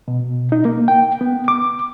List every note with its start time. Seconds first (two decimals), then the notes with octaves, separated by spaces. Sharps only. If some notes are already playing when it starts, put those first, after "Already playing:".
0.08 B2
0.52 D#4
0.65 A#3
0.88 G5
1.21 B3
1.48 D6